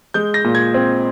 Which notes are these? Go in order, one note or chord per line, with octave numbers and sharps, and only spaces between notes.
G#3 G6
A#6
A#2
G#6
C4